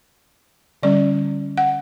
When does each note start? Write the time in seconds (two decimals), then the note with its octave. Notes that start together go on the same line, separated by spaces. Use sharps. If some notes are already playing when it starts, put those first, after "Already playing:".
0.83 D3 G3 C#4 D5
1.58 F#5